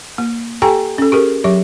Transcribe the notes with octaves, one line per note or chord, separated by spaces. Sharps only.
A#3
G4 A4 G5 G#5 A#5
C#4 A4
G4 G#4 A#4
F#3 G4 E5